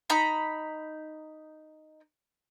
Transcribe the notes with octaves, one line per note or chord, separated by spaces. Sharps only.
D#4 A#5 B5